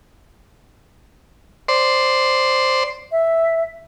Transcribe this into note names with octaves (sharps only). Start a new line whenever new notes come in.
C5 D5 C6
E5